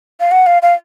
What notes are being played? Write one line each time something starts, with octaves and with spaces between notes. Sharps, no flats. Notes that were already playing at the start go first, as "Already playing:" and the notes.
F5
F#5
F5
F5